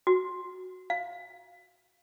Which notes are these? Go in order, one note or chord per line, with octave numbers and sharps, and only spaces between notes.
F#4
F5